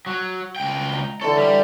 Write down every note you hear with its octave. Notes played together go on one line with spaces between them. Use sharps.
F#3
C#2 G5
A#5
D3 E3 A4 C#5
G3